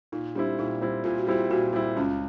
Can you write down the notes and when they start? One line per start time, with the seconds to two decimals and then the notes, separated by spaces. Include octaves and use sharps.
0.12 A#2 D#4
0.35 G3 C4 D4 E4
0.59 A#2 D#4
0.81 G3 C4 E4
1.04 A#2 F4
1.18 F#4
1.27 G3 C4 E4 F4
1.51 A#2 F#4
1.73 G3 C4 E4 F4
1.96 C#2 C#4